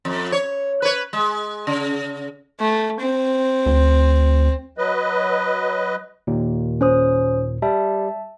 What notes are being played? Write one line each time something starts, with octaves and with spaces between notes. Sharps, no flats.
F2
C#5
B4 C#5
G#3
C#3
A3
C4
D2
F#3 B4 D#5
D#2 A#2
C#4 C5 D#6
G3 E5 A5